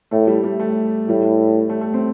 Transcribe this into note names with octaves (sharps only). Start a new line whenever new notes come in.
A2 A3
G3
G3
A3
A2 G3
A3
A3
C4